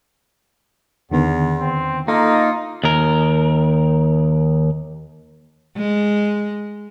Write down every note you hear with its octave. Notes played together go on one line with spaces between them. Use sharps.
E2 D3 D#3 B3
C4
A#3 D#4 F4 A4
D#2 A#4
G#3